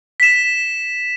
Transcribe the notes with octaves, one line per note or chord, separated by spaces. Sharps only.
B6 E7